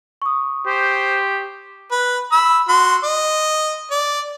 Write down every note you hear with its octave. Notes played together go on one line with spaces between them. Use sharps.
C#6 D#6
G4 C5
B4
B5 E6
F#4 C6
D#5
D5